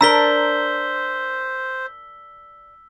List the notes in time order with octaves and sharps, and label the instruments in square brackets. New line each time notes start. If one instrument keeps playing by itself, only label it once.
[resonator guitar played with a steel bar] D4 A#4 [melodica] C5 [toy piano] A#5 [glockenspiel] E6 B6 G7